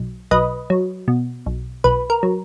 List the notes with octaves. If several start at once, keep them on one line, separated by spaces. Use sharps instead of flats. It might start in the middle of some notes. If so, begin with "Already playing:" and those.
Already playing: B1
B1 B4 D#5
F#3
B2
B1
B1 B4
A#4
F#3